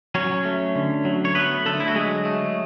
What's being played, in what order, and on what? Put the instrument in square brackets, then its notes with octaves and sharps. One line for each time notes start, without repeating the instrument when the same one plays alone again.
[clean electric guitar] F#3 C#4 C#5
A3
D3
F#3
C#5
A3 B3 B4
D3 A3 A4
E4
F#4
F#3 G#3 G#4
A3